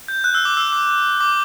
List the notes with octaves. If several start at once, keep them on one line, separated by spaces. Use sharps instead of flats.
G6
F#6
E6
D6
E6
D6
D6